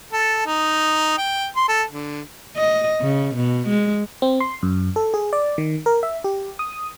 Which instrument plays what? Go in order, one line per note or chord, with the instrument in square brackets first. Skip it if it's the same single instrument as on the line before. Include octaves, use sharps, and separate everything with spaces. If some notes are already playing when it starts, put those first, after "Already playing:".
[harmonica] A4
D#4
G5
C6
A4
D3
[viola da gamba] D#5
C#3
B2
G#3
[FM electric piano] C4
C6
F#2
A4
G#4
D5
D#3
A#4
E5
G4
D#6